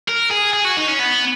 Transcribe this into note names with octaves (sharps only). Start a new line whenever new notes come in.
A#4
G#4
G#4
F#4
D#4
C#4
B3